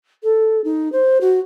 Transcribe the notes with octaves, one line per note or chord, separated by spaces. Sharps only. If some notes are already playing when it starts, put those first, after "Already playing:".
A4
D#4
C5
F#4